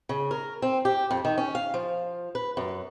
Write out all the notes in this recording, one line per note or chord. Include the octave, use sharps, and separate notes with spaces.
C#3
A#4
C4
G4
F2
D#3
C#4
F5
F3
B4
F#2